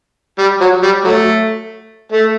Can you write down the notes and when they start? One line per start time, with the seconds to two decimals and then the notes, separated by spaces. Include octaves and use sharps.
0.39 G3
0.61 F#3
0.83 G3
1.04 F#3 A3
2.12 A3